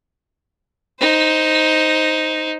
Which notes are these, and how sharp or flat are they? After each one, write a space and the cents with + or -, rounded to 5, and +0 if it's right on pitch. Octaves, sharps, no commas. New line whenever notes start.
D#4 +5 C5 +0